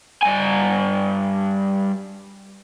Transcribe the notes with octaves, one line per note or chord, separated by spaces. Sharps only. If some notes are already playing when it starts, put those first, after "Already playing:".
G2 G#5